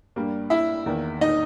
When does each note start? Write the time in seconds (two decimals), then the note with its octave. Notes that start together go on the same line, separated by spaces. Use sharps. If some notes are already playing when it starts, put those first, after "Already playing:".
0.16 G2 G3 A#3
0.50 E4 E5
0.86 E2 D#3 A#3
1.21 D#4 D#5